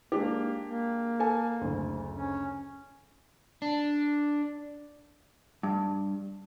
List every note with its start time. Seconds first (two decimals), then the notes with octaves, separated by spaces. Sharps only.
0.12 G#3 A#3 D4 G4
0.65 A#3
1.20 A4 G#5
1.61 F#1 D2
2.14 C#4
3.62 D4
5.63 G2